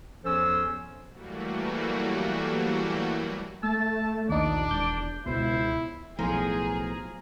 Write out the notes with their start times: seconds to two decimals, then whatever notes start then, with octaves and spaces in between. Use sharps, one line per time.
0.24 E2 F3 C#4 A4 C5 E6
1.12 E3 F#3 G3 A3 A#3 F#4
3.63 A3 A5 E6 A6
4.29 A#1 D#2 D4 D#4 D5
4.71 E1 G6
5.26 C#2 B2 E4 C5
6.19 B1 A2 F3 G#4 A#5